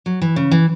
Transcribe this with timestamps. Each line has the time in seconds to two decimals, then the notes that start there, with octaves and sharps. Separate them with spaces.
0.06 F#3
0.22 E3
0.36 C#3
0.51 E3